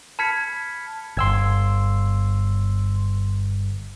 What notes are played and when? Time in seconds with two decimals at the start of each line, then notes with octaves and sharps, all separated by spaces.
0.19 A5 B5 F6 G#6 B6 C#7
1.17 G1 C6 E6 G#6